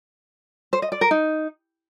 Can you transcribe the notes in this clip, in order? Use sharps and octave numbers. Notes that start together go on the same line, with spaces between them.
C5
D#5
D5
A#4
D#4